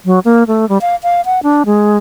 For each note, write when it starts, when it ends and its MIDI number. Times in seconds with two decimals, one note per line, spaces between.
0.05 0.19 54
0.25 0.44 58
0.48 0.68 57
0.69 0.78 55
0.81 0.96 77
1.03 1.21 77
1.25 1.40 78
1.43 1.63 62
1.66 1.98 56